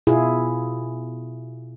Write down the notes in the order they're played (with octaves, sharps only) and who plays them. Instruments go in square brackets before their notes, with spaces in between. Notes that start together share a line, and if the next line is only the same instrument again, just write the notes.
[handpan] B2 E4 F4 G#4